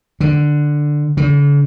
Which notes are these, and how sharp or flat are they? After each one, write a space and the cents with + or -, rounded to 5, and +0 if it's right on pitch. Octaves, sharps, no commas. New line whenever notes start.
D3 +10
D3 -45